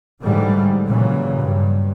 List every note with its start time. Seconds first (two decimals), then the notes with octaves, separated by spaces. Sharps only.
0.23 G#2 D3 E3 F#3 G3 A3
0.86 A#2 C#3 E3 F#3
1.41 G2